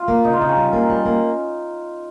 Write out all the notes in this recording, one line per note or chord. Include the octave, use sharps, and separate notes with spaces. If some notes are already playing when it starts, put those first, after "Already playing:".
Already playing: F4
A#3
C#3 D#4
F4
C#3 D#4
C#4
G3
A#3
G3
A#3